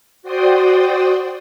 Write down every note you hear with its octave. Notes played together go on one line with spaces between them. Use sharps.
F#4 C5 D5 G5 C6 D#6